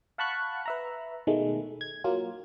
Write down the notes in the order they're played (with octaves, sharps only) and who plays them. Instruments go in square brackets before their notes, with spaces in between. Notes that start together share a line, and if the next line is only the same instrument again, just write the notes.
[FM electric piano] F5 F#5 A5 B5 C#6 F#6
B4 E5 A#5
B2 D#3 G#3 A3
G#6
F#3 A#3 F4